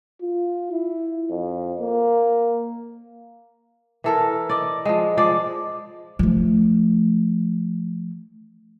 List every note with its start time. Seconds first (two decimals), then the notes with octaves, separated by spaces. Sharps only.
0.21 F4
0.72 E4
1.30 F2
1.80 A#3
4.04 E3 A4 A#4
4.49 D5 D#5
4.85 F3 G#3
5.17 F3 G#3 D5
6.19 F3 A3